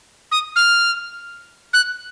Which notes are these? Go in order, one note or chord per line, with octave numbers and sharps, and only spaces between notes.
D#6
F6
F#6